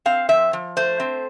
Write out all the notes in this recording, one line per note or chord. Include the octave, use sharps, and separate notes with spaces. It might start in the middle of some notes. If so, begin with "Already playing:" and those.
C4 F5
F3 E5
F3
A3 C5
C4